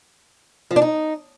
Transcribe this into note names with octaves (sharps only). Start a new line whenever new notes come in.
F3
D4
D#4